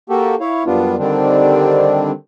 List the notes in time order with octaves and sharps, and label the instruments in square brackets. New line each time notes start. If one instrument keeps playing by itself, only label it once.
[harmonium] A#3 F#4 G4 A4
E4 C#5 F5
F#2 G3 B3 D4 F4
D3 D#3 G3 C4 D4